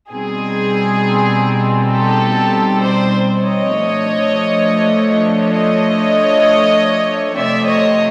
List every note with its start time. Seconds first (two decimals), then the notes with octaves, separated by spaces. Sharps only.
0.10 B2 G3 C4 D#4 G#4
1.91 G4 A4
2.82 C5 D5
3.43 C#5 D#5
3.73 F3 A3 D4
5.54 C#5 D#5
7.35 C3 F3 A3 C4 D5 E5
7.66 C#5 D#5